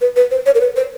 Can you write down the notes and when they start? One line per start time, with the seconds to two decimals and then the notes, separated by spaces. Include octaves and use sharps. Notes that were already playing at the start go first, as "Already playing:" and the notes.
0.01 B4
0.16 B4
0.31 C5
0.46 C#5
0.55 A#4
0.61 B4
0.76 C5